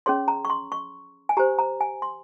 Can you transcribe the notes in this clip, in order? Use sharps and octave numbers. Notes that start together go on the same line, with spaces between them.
C#4 G#4 C#5 C6
A#5
C#6
C6
C#6
G#5
G4 C5 A#5
A#5
G#5
C6